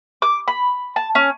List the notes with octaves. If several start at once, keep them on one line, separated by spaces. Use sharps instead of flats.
D6
B5
A5
C#4